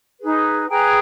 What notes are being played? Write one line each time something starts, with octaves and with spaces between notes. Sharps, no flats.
D#4 G#4 B4
G#4 B4 G5 A#5